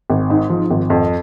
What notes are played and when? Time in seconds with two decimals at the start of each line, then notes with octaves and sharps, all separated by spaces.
0.10 G#1
0.30 G#2
0.50 F3
0.70 G#1
0.90 F2